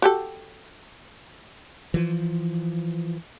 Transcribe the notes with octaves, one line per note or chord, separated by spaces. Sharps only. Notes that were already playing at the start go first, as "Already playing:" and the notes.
F#4 G4 A4
E3 F3